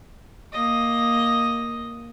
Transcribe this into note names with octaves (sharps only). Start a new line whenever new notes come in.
A#3 D#5